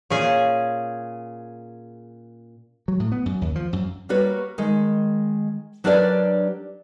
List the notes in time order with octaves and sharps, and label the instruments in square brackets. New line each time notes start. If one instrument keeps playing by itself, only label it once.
[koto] A#2 C#4 G#4 G#5
[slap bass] F#3
A2
B3
F#2
D#2
F3
F#2
[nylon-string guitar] G3 A#3 F#4 B4 C#5
D#3 G#3
F#3 D4 G4 A#4 B4 D5